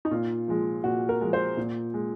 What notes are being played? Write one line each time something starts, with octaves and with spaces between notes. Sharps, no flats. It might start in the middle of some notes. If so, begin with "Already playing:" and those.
D#4
A#2 F4
F3 G#3
A#2 F#4
A#4
F3 G#3
C5
A#2
G#3